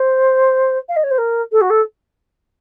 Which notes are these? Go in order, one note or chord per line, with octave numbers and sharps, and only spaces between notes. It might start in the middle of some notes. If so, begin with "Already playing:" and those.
Already playing: C5
F5
D#5
C#5
C5
A#4
A4
F#4
A4